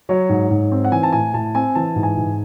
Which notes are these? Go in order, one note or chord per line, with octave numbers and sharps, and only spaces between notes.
F#3 C#5
G#2
G#2
C4
F#5
E3 G#5
A5
A2 G#5
A2 A5
C4 G#5
E3 A5
G#2
G#5
G#2